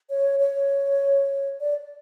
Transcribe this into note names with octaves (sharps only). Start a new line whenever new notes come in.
C#5
C#5
D5